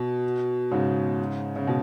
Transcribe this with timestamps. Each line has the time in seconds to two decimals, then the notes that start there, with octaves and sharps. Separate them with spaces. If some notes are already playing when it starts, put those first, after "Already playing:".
Already playing: B2
0.71 G#2 C#3
1.56 C#3
1.67 B2